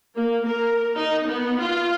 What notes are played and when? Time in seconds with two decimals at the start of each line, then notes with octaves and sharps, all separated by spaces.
0.16 A#3
0.45 A#4
0.96 D#4
1.26 B3
1.60 F4